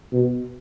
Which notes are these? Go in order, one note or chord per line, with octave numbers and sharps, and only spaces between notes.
B2